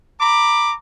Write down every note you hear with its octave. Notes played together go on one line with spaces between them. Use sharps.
A#5 B5 D6